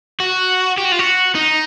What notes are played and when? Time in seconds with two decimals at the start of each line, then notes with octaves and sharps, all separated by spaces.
0.20 F#4
0.77 G4
0.85 F#4
0.92 F4
0.99 F#4
1.35 D#4